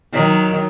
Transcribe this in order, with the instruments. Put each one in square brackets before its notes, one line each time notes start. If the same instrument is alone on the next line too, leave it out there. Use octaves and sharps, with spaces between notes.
[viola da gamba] D#3 F#3